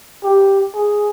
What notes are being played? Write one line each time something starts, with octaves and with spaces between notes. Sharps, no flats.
G4
G#4